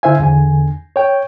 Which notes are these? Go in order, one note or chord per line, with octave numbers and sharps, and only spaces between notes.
D3 E4 C5 E5 F5 G#5
E2 D3 G#5
C#5 G5